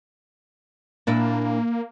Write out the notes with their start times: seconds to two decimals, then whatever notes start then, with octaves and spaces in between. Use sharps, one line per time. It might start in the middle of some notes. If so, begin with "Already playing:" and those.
1.07 A#2 A#3 D4 E4